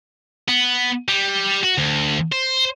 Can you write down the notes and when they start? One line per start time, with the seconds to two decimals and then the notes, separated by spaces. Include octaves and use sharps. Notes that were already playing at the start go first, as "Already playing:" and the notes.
0.48 B3
1.08 G3
1.64 F#4
1.78 D2
2.32 C5